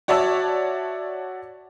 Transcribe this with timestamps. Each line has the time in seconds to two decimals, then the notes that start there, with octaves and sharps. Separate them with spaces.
0.08 F#4 C#5 D5 E5 A5 E6